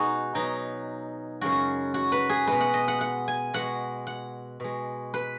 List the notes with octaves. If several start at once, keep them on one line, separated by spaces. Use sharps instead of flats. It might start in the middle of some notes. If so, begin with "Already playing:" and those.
Already playing: B2 G#3 D#4 F#4 G#4
B2 F#3 D#4
F#2 C#3 G#3 F#4
F#4
B4
G#4
B2 G#3 B4
F#5
D#5
F#5
F#5
G#5
B2 G#3 F#5
F#5
B2 G#3
B4